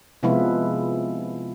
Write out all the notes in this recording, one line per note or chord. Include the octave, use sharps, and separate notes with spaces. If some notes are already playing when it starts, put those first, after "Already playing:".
C3 F3 G#3 B3 E4 F4